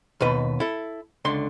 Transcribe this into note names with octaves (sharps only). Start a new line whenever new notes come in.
D#2 B2 B4
E4 A4
C#2 D3 C6